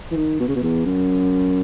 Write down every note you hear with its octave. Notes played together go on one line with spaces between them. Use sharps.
E3
D#3
B2
C#3
B2
E2
F#2